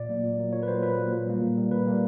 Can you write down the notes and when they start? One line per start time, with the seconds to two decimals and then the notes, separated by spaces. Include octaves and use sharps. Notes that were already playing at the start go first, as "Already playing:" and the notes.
Already playing: A#2 D5
0.09 F#3 A#3
0.24 A#2
0.38 F#3 A#3
0.53 A#2 C#5
0.63 B4
0.68 F#3 A#3 C5
0.83 A#2 B4
0.97 F#3 A#3
1.13 A#2
1.27 G3 A#3
1.42 A#2
1.57 G3 A#3
1.71 A#2 B4
1.86 G3 A#3